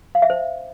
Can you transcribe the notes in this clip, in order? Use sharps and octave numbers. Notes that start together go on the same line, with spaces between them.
F5
E5
C5